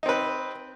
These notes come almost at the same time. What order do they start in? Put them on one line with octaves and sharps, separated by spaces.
D#4 C4 B4